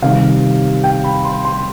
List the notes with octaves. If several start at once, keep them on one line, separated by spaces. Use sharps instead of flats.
C3 D#3 G3 F5
G5
B5
C6
C6